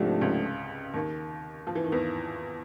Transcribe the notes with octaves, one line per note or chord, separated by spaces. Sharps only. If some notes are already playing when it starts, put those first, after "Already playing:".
Already playing: C2 G#2 C3 F3 A3 D4 G4
C#2 C#3
D#2 D#3
F3
E3
D#3
E2 E3